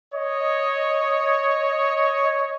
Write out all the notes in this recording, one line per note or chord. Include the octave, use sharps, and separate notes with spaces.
C#5 D#5